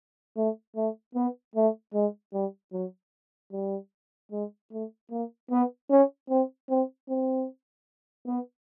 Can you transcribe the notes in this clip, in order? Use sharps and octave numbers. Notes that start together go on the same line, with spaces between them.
A3
A3
B3
A3
G#3
G3
F#3
G3
G#3
A3
A#3
B3
C#4
C4
C4
C4
B3